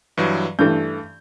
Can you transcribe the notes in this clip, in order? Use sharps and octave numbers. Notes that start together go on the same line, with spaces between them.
G2 E3 F#3
G2 E3 A3 G6